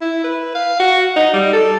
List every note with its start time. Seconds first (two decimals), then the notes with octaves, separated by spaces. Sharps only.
0.01 E4
0.24 B4
0.55 F5
0.80 F#4
1.16 D#4
1.34 G3
1.53 A4